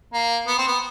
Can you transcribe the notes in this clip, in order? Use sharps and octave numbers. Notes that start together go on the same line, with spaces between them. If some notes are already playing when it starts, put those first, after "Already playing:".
A#3
B3
C4
B3